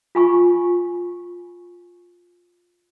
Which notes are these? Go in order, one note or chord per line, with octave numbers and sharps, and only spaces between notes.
F4 G#5 C#6